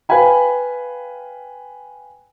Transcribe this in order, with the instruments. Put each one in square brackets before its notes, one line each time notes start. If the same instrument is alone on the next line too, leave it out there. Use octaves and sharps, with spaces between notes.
[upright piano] B4 F5 G5 G#5 B5